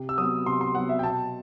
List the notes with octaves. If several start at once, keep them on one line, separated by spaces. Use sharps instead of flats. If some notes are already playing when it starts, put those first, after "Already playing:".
Already playing: C3
E6
F#3 B3 D#6
C3 C6
C6
F#3 B3 F#5
E5
G5
B2 A5